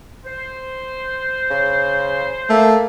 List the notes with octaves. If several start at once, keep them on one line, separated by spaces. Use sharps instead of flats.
C5
C#3
A3 A#3